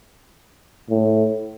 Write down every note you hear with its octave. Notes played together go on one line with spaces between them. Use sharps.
A2